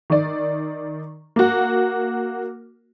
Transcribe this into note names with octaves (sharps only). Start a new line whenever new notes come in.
D#3 D5
A#3 F#4